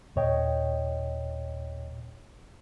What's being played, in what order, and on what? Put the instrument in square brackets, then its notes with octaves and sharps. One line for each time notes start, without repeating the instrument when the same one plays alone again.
[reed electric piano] D#2 A#2 C#5 D#5 G5